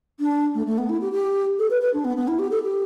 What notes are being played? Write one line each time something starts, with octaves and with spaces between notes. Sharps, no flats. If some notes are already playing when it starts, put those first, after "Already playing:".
D4
A3
A3
B3
E4
G4
G4
A4
B4
B4
D4
B3
B3
E4
G4
A4
G4